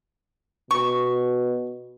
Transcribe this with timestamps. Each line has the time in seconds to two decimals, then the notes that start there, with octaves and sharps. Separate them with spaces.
0.71 B2 C#6